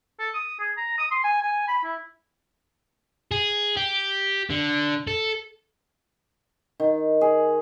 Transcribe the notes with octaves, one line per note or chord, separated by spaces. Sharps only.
A4
D#6
G#4
A#5
D#6
C6
G#5
G#5
B5
E4
G#4
G4
D3
A4
D#3
G#4